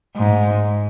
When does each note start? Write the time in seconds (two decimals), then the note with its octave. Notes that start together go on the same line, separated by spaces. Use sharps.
0.16 G#2